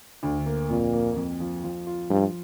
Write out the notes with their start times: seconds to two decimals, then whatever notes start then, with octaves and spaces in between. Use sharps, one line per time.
0.23 D2 D3
0.46 A#3
0.70 F2 A#2
0.93 A#3
1.16 F2
1.40 F3
1.63 F3
1.87 F4
2.10 G2 F3